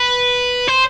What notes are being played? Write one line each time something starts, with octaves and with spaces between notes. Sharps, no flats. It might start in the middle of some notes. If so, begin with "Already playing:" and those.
Already playing: B4
C5